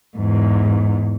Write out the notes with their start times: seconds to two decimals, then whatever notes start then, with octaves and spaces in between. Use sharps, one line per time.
0.16 E2 G#2